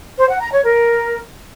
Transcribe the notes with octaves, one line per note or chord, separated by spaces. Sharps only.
C5
F#5
A#5
C#5
A#4